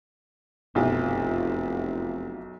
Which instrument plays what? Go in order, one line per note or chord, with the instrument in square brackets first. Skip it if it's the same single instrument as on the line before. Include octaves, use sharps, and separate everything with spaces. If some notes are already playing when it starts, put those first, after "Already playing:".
[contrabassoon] F1 [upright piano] B1 F#2 [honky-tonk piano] E4 F4 G4